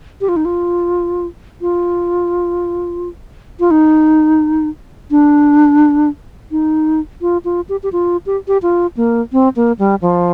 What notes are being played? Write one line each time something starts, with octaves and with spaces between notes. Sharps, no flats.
G4
F4
D#4
F4
F4
F4
D#4
D4
D#4
F4
F4
G4
G4
F4
G4
G4
F4
A#3
C4
A#3
G3
F3